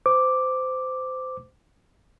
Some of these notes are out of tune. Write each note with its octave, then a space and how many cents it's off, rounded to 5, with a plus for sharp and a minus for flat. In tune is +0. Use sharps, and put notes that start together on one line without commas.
C5 -25 D6 +0